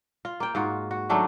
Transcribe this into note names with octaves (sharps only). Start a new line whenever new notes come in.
F4
A#3 G5
G#2 F4 F#4
F#4
D#3 F#3 A3 D4